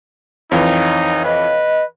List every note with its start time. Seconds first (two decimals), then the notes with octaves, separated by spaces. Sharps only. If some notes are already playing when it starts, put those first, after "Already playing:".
0.52 F2 E3 D#4 C#5 F5 G5
1.25 B4 D#5